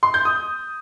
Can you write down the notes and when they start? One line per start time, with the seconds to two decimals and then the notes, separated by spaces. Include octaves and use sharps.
0.03 C6
0.14 G6
0.25 D#6